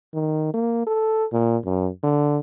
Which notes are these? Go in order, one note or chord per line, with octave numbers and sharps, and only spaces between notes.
D#3
A#3
A4
A#2
F#2
D3